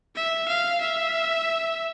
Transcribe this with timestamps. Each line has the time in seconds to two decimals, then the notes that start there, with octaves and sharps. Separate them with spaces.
0.15 E5
0.48 F5
0.81 E5